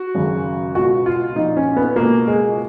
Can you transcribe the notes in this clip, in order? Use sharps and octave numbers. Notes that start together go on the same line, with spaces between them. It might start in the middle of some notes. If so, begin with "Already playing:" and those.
Already playing: F#4
G#1 F#2 C#3
C#2 B2 F#4
F4
A#1 A#2 D#4
C#4
B3
C#2 B2 A#3
G#3